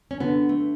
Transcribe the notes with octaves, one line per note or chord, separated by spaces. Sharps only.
C#4
D3 B3
A3